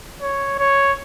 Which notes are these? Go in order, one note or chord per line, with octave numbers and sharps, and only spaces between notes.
C#5
C#5